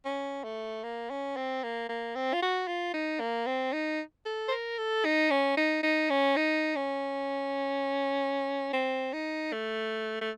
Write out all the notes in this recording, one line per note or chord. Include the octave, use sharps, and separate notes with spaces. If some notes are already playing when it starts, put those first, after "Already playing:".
C#4
A3
A#3
C#4
C4
A#3
A#3
C4
F4
F#4
F4
D#4
A#3
C4
D#4
A4
C5
A#4
A4
D#4
C#4
D#4
D#4
C#4
D#4
C#4
C4
D#4
A3
A3